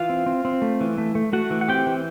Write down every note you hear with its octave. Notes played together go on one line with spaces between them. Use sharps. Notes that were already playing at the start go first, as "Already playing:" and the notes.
Already playing: E3 F4 F5
C4
C4
C4
A3
E3
A3
A3
A3 F#4 F#5
E3
F#5
C4 G4 G5
E3